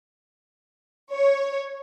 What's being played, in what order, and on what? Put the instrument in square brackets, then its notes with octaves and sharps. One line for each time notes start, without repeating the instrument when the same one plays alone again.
[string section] C#5